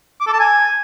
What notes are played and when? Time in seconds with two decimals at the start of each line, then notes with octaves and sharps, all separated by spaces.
0.21 D6
0.27 A4
0.33 A5
0.39 G#5